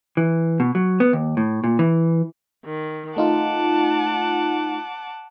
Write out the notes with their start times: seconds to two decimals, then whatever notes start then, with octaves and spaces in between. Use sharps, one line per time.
0.17 E3
0.60 B2
0.75 F#3
1.00 B3
1.13 D#2
1.37 A2
1.64 A#2
1.79 E3
2.65 D#3
3.16 A3 D#4 F4 F#5 A5 D6